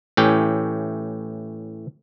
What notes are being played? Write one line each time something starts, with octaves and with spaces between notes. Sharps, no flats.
A2 E3 C#4 G4